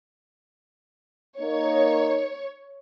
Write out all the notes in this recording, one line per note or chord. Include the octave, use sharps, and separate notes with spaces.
A#3 D#4 C#5